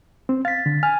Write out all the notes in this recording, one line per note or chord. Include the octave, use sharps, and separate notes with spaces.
C4
F5 A6 B6
D3
G#5 F6